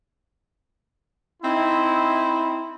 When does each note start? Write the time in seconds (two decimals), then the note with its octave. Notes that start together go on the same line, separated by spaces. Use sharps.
1.43 C4 D#4 E4